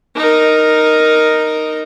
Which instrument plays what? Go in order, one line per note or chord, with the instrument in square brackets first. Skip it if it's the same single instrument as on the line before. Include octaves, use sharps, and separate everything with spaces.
[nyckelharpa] D#4 A#4